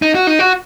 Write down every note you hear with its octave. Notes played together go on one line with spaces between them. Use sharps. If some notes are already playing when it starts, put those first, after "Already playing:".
D#4
F#4
D#4
F#4